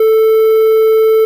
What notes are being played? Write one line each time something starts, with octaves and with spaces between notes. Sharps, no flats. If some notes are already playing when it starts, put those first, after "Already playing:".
Already playing: A4